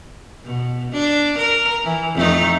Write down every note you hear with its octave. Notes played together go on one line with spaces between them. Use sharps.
B2
D4
A#4
E3
F2 A3 D#4